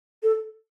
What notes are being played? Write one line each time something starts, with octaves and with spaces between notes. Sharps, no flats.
A4